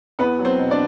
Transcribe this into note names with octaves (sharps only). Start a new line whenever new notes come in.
E2 B3 B4
F#3
C4 C5
B2
D4 D5